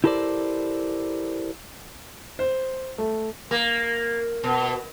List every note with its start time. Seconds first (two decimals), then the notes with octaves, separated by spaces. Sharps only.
0.04 E4 G4 A4 A#4 C5 D5
2.39 C5
2.98 A3
3.51 A#3
4.44 B2